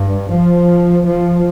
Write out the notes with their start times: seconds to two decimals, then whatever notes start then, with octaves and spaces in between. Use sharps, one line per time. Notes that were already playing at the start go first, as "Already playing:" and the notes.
Already playing: G2
0.31 F3
1.05 F3